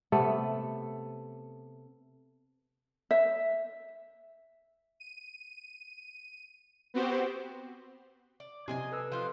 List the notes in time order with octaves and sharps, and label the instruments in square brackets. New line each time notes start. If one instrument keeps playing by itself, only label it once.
[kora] C3 A3 B3 A4
[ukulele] E5
[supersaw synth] D#7
B3 C4 F#4 G4 C5
[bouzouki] D5
[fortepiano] C3 [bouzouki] G#4 D#5 G#5
[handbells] A4 B4 E6
[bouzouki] F3 C5 F5 [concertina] F4 F#6